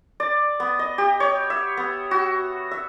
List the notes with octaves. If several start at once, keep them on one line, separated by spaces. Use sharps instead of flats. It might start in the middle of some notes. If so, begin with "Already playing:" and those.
D5
B3
D#5
G4
C#5
E5
B3
F#4
E5